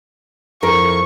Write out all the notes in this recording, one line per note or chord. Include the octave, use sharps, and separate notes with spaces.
F2 E4 A#4 C#6